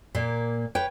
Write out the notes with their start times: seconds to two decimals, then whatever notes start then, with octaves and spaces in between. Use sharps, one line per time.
0.15 A#2 A#3
0.75 B4 C#5 G5